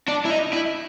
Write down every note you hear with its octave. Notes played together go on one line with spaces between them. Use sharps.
D4
E4
D#4
E4